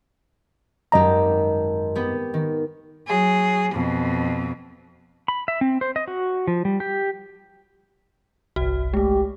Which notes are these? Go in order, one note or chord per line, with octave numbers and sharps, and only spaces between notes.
G#1 F#2 G4 D#5 A#5
B3 G4
D#3
F#3 G#4
F2 B2
B5
E5
C4
C5
D#5
F#4
F3
G3
G4
G1 C2 F#4
G#3 A3 G4